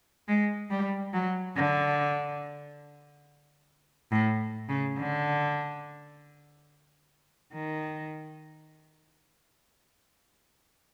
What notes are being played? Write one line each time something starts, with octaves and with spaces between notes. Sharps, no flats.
G#3
G3
F#3
D3
A2
C#3
D3
D#3